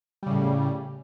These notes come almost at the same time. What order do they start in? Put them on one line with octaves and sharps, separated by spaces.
G3 C#3 A2